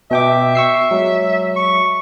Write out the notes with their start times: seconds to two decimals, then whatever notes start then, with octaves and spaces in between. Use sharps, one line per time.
0.11 B2 E5 G5 D6
0.55 C#6 E6 C7
0.91 F#3 G#3
1.56 C#6